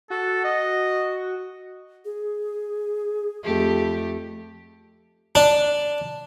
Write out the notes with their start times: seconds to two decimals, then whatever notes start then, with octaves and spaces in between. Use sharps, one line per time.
0.10 F#4 A4
0.44 D#5
2.05 G#4
3.44 F2 A3 G4
5.35 D4